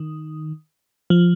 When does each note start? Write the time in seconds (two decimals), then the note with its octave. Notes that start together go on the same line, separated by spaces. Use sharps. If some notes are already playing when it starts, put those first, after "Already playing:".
Already playing: D#3
1.10 F3